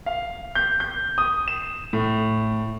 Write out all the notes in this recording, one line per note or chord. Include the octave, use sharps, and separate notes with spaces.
F5
G6
G6
D#6
E7
A2